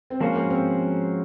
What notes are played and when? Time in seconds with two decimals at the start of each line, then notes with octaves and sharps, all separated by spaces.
0.10 C4
0.21 F3 G#3 A#3 C#4 F#4 C5
0.35 A#3
0.50 C4